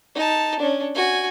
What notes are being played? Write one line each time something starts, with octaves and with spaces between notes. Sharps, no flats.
D#4 A5
C#4 D4
F#4 G#5